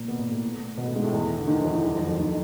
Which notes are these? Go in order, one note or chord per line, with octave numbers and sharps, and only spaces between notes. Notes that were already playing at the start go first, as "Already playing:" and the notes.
Already playing: A#2 A#3
B2 B3
A#2 A#3
A2 A3
B2 B3
A2 A3
G#2 G#3
A2 A3
E2 E3
D3
D#2 D#3
F3
E2 E3
E2 E3
F2 F3
F#3
F2 F3
D#2 D#3